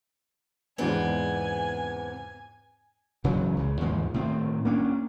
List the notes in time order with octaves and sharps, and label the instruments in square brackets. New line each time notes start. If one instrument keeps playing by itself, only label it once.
[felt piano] E2 G#2 D4 [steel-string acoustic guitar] C#3 B3 C4 [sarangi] G#5
[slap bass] F#1 C#3 E3 F#3
C#2 C#3
D#2 G#2 E3 F3
A2 D#3 C4
A#3 C#4 D4